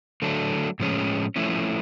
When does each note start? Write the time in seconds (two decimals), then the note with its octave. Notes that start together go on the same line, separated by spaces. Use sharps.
0.22 D3 F#3 A3 D4
0.80 A2 F3 G#3 C#4
1.36 F3 A3 C#4 E4